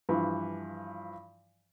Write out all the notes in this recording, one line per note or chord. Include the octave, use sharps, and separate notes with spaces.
G2 E3 F3